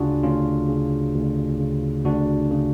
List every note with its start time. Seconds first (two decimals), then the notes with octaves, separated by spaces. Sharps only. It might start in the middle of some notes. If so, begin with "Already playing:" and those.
Already playing: D2 C#3 D4 F4 F#4 G#4
0.23 D2 C#4 F4
0.69 C#3
1.15 D2
1.59 C#3
2.05 D2 D4 F#4
2.51 C#3